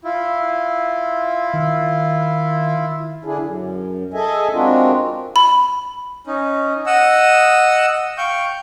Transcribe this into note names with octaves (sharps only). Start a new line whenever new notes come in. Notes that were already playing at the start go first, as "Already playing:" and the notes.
E4 F4
D#3
D3 D4 E4 G#4
F#2
G#4 A4 D#5 E5 G#5
G#3 C4 D4 F4 F#4 A#4
B5
C#4 D#4
D#5 F#5 E6
F5 G5 C#6 G6